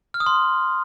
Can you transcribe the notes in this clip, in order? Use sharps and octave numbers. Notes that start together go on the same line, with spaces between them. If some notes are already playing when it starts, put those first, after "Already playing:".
F6
D#6
C6